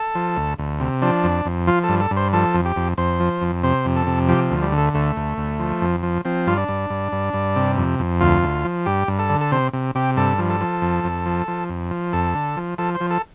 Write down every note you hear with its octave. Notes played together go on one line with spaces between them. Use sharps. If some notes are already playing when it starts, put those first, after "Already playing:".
Already playing: A4
F3
D2
D2
C3
F3 D4
F2
F2
F3 F4
A4
G2
A4
G2
C5
F3 A4
F2
G4
F2
F2 C5
F3
F2
C3 C5
F2
A4
C3
F3 G4
D2
G3
D3
A3
D2 A3
D2
D2
F3
F2
F3
F3 C4
G2 F4
D4
G2
G2
G2
G2
C3
F2
F2
D2 F4
D2
F3
G2 G4
G2
A4
D3
A4
C3 C5
C3
C3 G4
G2 A4
F3
A4
F3
F2
F2
F3
F3
F2
F3
F2 A4
D3
F3
F3 A4
C5
F3
A4